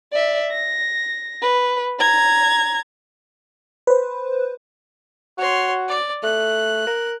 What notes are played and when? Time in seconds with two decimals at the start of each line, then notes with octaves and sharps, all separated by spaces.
0.12 D5 E5
0.52 A#6
1.42 B4
2.00 A#5 G#6
3.87 B4 C5
5.38 F#4 C#5 C6
5.88 D5
6.23 A3 F#6
6.87 A#4